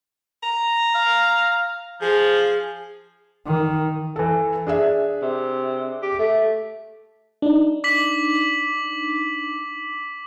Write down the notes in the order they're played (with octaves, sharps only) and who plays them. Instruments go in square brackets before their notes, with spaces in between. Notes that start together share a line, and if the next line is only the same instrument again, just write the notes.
[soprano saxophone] A#5
[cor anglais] F5
[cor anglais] F3 [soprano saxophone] G#4
[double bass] D#3
[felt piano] E3 A4
D4 G#4 E5
[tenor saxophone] C3
G4
A3
[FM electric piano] D4 D#4
[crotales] D6 B6 F#7